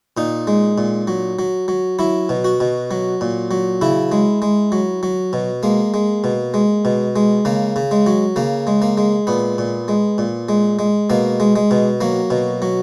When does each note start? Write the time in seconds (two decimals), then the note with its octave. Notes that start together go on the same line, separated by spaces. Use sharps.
0.17 A#2 D#4
0.47 G#3
0.78 A#2
1.08 F#3
1.39 F#3
1.68 F#3
1.99 F#3 E4
2.29 B2
2.44 F#4
2.60 B2
2.91 F#3
3.21 A#2
3.51 F#3
3.81 C#3 E4
4.12 G#3
4.42 G#3
4.72 F#3
5.03 F#3
5.33 B2
5.63 G#3 A#3
5.94 G#3
6.24 B2
6.54 G#3
6.85 B2
7.16 G#3
7.45 C#3 A#3
7.76 C#3
7.91 G#3
8.07 F#3
8.36 C#3 A#3
8.67 G#3
8.82 A#3
8.98 G#3
9.27 A#2 B3
9.58 A#2
9.88 G#3
10.18 A#2
10.49 G#3
10.79 G#3
11.10 B2 A#3
11.40 G#3
11.56 G#3
11.71 B2
12.01 F#3 A#3
12.30 B2
12.62 F#3